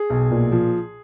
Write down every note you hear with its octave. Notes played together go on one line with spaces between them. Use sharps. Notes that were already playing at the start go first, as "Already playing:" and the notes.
Already playing: G#4
B1
A#2
F3